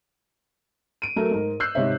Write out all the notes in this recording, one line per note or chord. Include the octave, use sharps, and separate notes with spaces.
D7 D#7
F#3 A3 A4 A#4
G#2 A#4
E6 F#6 G6 C7
G#2 C3 C#5 E5